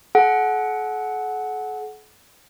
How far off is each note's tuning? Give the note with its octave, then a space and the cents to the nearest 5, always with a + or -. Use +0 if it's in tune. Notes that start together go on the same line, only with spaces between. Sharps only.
A4 -45 F#5 +0